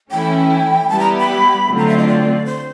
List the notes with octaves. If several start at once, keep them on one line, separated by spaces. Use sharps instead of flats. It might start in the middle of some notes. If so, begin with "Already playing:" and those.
E3 A3 C#4 E4 G5
G3 B3 E4 G4 A5
A#5
B5
D3 F#3 A3 C4 F4
A#5
E5
D#5
D5
C5